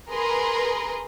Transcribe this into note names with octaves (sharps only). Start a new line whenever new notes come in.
G#4 A#4 B4 A#5 C6